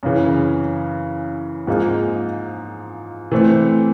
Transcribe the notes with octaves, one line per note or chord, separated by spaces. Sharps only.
F#2 C#3 E3
G#2 F3 A#3 D#4 G#4
E3 A3 C4